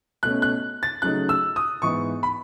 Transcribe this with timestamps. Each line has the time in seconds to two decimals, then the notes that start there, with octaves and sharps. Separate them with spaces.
0.23 B2 A3 C#4 F#6
0.42 F#6
0.83 A6
1.02 C#3 F#3 A3 D#4 F#6
1.29 E6
1.56 D#6
1.82 G#2 E3 B3 D#4 C#6
2.23 B5